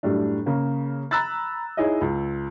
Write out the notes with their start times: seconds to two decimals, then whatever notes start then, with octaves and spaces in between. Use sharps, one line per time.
0.03 F#2 A2 G3 A3 D4
0.46 C#3 A#3
1.11 A#5 B5 E6 F#6 A6
1.77 D#4 E4 G#4 C#5 D#5
2.01 C#2